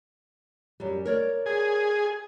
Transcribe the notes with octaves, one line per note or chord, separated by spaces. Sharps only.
F#2 G3
A#4 C#5 D5
G#4